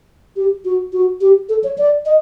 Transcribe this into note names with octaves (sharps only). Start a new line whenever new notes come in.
G4
F#4
F#4
G4
A4
C#5
D5
D#5